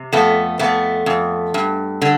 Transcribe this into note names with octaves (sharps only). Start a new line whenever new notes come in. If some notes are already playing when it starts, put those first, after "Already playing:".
Already playing: C3
F2 A3 B3
F2 A3 B3
F2
G2
D3